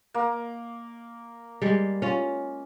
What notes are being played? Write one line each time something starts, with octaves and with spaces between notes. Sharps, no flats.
A#3
G3 G#3
C#4 F4